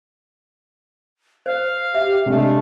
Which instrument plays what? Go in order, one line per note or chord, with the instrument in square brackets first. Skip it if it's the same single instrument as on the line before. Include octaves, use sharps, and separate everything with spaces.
[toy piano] C5 [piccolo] F5
[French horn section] G4 [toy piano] E5
[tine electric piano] C3 [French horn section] G#3 A3 D4